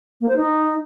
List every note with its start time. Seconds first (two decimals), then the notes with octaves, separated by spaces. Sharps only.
0.21 A#3
0.28 C5
0.36 D#4